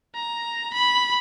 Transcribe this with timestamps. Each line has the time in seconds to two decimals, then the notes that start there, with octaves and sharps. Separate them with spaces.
0.15 A#5
0.74 B5